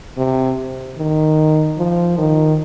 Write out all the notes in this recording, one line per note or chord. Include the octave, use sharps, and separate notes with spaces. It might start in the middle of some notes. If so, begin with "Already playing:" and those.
C3
D#3
F3
D#3